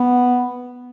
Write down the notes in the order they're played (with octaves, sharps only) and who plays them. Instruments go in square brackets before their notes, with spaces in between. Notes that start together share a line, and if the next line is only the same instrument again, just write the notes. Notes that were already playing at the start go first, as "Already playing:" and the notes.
Already playing: [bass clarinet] B3